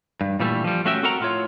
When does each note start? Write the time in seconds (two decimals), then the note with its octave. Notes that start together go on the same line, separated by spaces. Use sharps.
0.21 G2
0.40 A#2 E3 G3 A3
0.64 F3 G3
0.85 A3 C#4 F#4 G4 E5
1.03 C4 F#4 A4 A#4 F#5 A#5
1.20 A2 F4 C#5